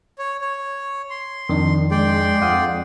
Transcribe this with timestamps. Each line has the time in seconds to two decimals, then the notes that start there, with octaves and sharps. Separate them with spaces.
0.18 C#5
0.41 C#5
1.10 C6
1.49 F2 D#3 D4
1.91 G#3 D5 G5 C6
2.41 F2 F5 F#5 D#6